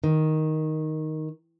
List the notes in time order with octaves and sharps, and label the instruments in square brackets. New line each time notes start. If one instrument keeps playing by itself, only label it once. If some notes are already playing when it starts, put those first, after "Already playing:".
[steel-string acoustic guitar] D#3